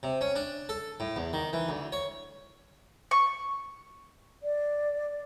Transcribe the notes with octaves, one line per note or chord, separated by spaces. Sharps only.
C3
C#4
D4
A4
A2
E2
D#3
E3
D2
C#5
C#6
D5